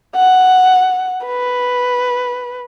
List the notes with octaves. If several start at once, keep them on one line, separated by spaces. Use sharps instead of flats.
F#5
B4